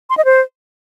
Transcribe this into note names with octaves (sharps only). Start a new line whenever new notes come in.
C6
D#5
C5